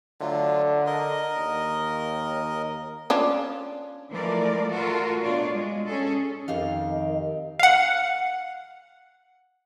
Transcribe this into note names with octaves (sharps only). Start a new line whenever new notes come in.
D3 F#3 A3 F4
A#4 D#5
D#2
C#4 D4 F4
E3 F3 G#3 A3 A#4 D5
A3 F4 F#4 A4 A#4
B2 D4 F4 C#5 D5
G#3
C#4 G#4 A4
F2 D#3 G4 D#5 F5
F5 F#5